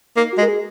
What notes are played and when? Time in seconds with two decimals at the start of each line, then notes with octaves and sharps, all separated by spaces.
0.16 A#3 D#4
0.32 F#4
0.38 G#3
0.42 A#4
0.48 G#4